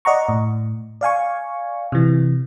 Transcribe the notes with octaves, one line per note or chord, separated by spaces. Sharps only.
D5 D#5 F#5 A#5 C#6
A2
D5 F5 G#5 C#6
C3 E3